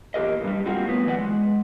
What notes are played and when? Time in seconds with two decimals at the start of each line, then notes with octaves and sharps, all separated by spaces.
0.14 E2 A#2 G4 A#4 D#5
0.44 G2 G3
0.66 G3 A#3 C4 F4 F#4
0.85 A2 B3
1.06 F#2 E3 D5 F#5
1.18 G#3